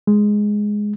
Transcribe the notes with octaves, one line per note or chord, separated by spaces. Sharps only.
G#3